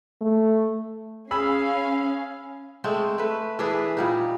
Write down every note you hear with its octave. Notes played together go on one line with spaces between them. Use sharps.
A3
C#4 G#4 F5 B5 E6
G#3 A3 C4
A3 B4
E3 D4 G#4 B4
A#2 G3 D#4